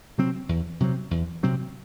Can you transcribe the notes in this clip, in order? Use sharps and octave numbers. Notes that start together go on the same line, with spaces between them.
C3 F#3 C4
E2
C3 F#3 C4
E2
C3 F#3 C4